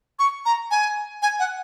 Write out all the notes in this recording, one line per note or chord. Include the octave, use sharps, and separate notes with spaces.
C#6
A#5
G#5
G#5
F#5